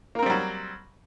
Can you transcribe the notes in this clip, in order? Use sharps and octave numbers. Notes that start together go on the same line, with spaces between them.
F#3 G3 A#3 C4 A#4